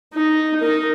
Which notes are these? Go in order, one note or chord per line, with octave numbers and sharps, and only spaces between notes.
D#4
D#4 A#4